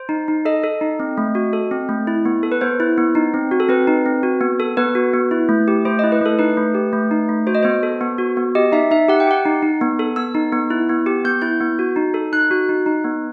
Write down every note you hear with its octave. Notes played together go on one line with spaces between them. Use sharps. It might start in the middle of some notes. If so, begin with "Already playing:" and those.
Already playing: C5
D#4
D#4
A4 D#5
A4
D#4
C4
A3
F#4
A4
C4
A3
E4
B3
A4
B4
B3 C5
E4
B3
D#4
C4
F#4
A4
C4 B4
D#4
C4
F#4
B3
A4
B3 B4
F#4
B3
E4
A3
G4
A3 C5
E4 D#5
B4
A3 A4
D#4 B4
A3
G4
A3
D#4
A3
F#4 C5
D#5
B3 C5
A4
B3
F#4
B3
G4 D#5
D#4 E5
D#4 E5
G4 F#5
G5
G4 F#5
D#4
D#4
B3
A4
B3 E6
D#4
B3
E4
B3
G4
B3 G6
E4 G6
B3
F#4
D#4
A4
D#4 F#6
F#4
D#4
D#4
B3